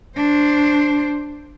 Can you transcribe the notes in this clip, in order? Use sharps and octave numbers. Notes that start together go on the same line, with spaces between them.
D4 C5